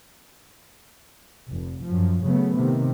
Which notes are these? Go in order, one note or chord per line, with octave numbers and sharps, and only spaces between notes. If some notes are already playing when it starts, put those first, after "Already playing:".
F1
F#2 F3
C#3 F#3 A3 B3
C3 D#3